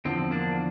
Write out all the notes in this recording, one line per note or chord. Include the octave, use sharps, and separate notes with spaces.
E2 D3 F3 C4
A#3 D4